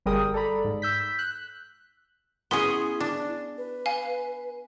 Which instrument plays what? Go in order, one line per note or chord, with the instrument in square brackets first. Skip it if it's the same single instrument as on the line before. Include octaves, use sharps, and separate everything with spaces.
[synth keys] G1 G3 G#4 A#4 G5 D#6
A4 D5 A#5 B5
G#2
E6 G6 B6
F#6
[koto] B3 C#4 G#4 [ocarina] E4 [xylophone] C6
[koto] D4
[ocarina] B4
[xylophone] F5 G#5